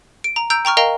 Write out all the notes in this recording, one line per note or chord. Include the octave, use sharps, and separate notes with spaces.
D7
A#5
A#5 E6 G6 D7
G5 A#5 C#6 F6
A#4 D#5 F5 G5 A#5